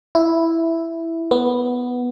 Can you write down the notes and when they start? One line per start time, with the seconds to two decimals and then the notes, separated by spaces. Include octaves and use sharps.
0.15 E4
1.31 B3